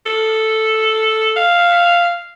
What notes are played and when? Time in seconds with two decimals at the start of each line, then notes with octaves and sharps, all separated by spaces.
0.06 A4
1.36 F5